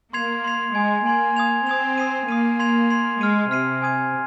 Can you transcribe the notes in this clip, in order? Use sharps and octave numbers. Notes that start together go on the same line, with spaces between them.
A#3 C6 G#6 C7 F7
C6 G#6 C7 F7
G#3 G#5 C6 G#6
A#3 G#5 C6 G#6
D#6 G#6 F7
C4 D#6 G#6 F7
D#6 C7 D#7
A#3 D#6 C7 D#7
C6 G#6 C7 F7
C6 G#6 C7 F7
G#3 F6 C7 D#7
C3 F6 C7 D#7
G#5 D#6 G#6 D#7